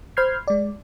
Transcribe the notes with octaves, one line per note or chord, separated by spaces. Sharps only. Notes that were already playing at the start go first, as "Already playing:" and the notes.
C5 B5 F6 G6 G#6 C7
G#3 D5